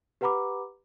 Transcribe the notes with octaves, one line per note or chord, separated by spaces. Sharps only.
G4 B4 F#5 A#5 B5 D6